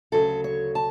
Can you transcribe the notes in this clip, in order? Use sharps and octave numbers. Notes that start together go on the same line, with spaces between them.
D2 C#3 F#3 A4
C#5
A5